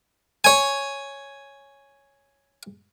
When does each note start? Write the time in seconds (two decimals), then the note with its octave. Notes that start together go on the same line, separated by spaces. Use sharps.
0.44 C#5 G#5